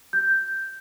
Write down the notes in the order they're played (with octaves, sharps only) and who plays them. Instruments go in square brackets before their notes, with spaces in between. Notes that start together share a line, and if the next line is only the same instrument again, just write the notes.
[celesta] G6